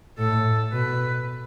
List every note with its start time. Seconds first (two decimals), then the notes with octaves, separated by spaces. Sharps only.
0.18 A2 A4
0.72 B2 B4